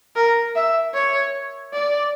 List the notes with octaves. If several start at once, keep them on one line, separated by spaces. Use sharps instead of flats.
A#4
E5
C#5
D5